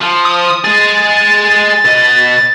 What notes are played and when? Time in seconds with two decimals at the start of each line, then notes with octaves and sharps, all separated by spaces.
0.01 F3
0.25 D#6
0.64 G#3 G#4 A6
1.85 B2 D#5